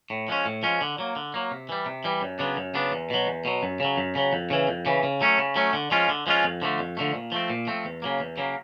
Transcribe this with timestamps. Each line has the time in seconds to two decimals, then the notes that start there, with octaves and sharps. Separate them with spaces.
0.10 A2
0.28 F3 G#3 C#4
0.46 A2
0.63 F3 G#3 C#4
0.81 D3
0.98 F#3 A#3
1.16 D3
1.34 F#3 A#3
1.51 C3
1.69 E3 G3
1.86 C3
2.04 E3 G3
2.22 F#2
2.39 C#3 F#3 B3 D4
2.57 F#2
2.74 C#3 F#3 B3 D4
2.92 E2
3.10 B2 F#3
3.27 E2
3.45 B2 F#3
3.63 F#2
3.80 C#3 F#3
3.98 F#2
4.15 C#3 F#3
4.33 F2
4.50 C#3 E3
4.68 F2
4.86 C#3 E3
5.03 C#3
5.21 F#3 A3 C#4
5.38 C#3
5.56 F#3 A3 C#4
5.74 D3
5.91 F3 G#3 C#4 F4
6.09 D3
6.27 F3 G#3 C#4 F4
6.44 F2
6.62 D3 F3 A3
6.79 F2
6.97 D3 F3 A3
7.15 A#2
7.32 F3 A3 C4
7.50 A#2
7.67 F3 A3 C4
7.85 E2
8.02 C#3 F#3 A#3
8.20 E2
8.38 C#3 F#3 A#3